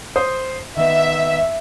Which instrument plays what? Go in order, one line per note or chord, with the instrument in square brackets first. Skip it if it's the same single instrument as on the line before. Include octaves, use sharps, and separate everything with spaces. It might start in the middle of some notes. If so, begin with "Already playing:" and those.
[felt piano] C5 D#6
[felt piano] D#3 B3 [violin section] E5